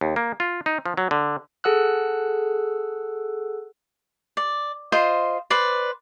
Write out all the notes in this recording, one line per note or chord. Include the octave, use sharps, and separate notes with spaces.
D#2
A#3
F4
D#4
F3
F#3
D3
G#4 A4 F#5 E6 F#6
D5
F4 C5 D#5
B4 C5 D5